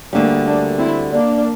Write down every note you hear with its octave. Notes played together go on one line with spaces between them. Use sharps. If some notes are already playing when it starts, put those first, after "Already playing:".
D2 D3 G3 A#3 D4
A#3 D4
C4 E4
A#3 D4